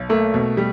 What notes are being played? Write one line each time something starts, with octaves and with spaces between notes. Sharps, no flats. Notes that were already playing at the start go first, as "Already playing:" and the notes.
Already playing: B1
A3 A#3
B2
G3